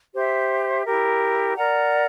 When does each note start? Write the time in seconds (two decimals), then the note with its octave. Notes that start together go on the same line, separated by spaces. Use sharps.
0.13 G4 C5 E5
0.84 E4 G4 A#4
1.56 A#4 D5 F#5 A#5